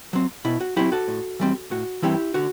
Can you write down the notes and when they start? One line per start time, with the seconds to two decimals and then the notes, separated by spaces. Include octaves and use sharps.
0.13 F#3 C4
0.45 B2 E4
0.61 F#4
0.76 F#3 C4 E4 G4
0.92 F#4 A4
1.08 A2
1.40 E3 G3 C4
1.71 A2 F#4
2.02 E3 G3 C4 E4 G4
2.34 D3 F#4